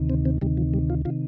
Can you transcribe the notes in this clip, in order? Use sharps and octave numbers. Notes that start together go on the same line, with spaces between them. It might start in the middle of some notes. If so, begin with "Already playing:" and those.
Already playing: D2 C3 D#3
C4
C4
D2 C3 D#3 G3
F3
G3
F4
C3 D#3 F4